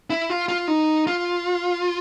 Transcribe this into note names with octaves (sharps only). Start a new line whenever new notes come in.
E4
F4
F4
D#4
F4